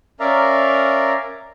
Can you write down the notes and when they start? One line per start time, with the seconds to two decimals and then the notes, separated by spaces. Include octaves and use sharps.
0.20 C#4 A#4 D5 E5 F5 A#5